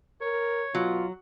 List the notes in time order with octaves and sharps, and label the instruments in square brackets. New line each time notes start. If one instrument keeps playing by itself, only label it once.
[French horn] A#4 [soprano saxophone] C#5
[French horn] B2 [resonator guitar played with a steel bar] F#3 [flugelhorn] F4